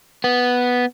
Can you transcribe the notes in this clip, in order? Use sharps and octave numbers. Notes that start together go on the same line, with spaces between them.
B3